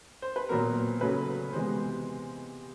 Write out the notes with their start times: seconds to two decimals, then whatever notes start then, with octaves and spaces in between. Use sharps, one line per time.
0.22 C5
0.36 B4
0.49 A#2 F#3 B3 A#4
1.01 C#3 F#3 A3 B4
1.53 C3 E3 G#3 B3 C5